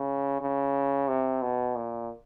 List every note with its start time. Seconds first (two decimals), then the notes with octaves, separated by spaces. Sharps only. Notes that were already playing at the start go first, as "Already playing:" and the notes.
Already playing: C#3
0.41 C#3
1.08 C3
1.42 B2
1.76 A#2